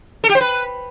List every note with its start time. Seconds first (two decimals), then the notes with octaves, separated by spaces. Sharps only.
0.24 A4
0.29 G4
0.35 C5
0.41 B4